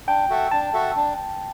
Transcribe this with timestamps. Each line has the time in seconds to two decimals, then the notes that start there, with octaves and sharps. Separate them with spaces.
0.08 D4 G5
0.30 F#4 A4 E5
0.51 D4 A5
0.73 F#4 A4 E5
0.96 D4